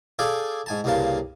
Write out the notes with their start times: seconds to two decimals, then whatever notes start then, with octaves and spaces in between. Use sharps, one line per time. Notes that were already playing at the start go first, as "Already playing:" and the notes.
0.19 G#4 A4 D5 F5 G5 G#5
0.66 G#2 G#5 A5
0.84 C2 G2 C#3 A#3 F5 A5